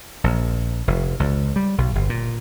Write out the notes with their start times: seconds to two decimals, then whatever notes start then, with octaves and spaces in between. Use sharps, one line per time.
0.24 A#1
0.88 F1
1.20 C#2
1.56 G3
1.78 B1
1.95 G1
2.09 A#2